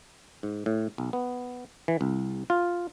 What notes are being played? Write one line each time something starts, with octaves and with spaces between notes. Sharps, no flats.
G#2
A2
B1
B3
E3
C2
F4